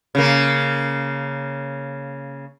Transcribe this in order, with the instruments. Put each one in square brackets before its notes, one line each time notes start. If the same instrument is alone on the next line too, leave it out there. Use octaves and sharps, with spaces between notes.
[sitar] C#3 A#3